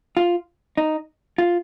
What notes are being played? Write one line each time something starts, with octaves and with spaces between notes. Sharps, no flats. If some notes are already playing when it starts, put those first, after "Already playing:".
F4
D#4
F4